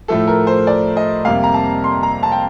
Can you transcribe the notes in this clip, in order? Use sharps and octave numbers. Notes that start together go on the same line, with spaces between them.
A2 F3 A3 A4
A#4
C5
D5
D#5
F2 C3 G3 A#3 F5
A#5
A5
C6
A#5
A5
G5